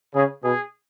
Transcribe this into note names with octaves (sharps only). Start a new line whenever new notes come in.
C#3 G#4
B2 G#4